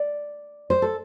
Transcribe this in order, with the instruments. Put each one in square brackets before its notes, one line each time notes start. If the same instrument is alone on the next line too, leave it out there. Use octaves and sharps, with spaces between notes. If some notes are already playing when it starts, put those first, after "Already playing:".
Already playing: [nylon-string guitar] D5
C5
A4